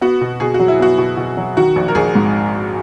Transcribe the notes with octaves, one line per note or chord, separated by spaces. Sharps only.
B3 F#4
B2
B2 G#4
F#4
F#3
E4
B3 F#4
B2
B2
F#3
D#3 F#4
A#1
A#4
A#1 G#4
G#2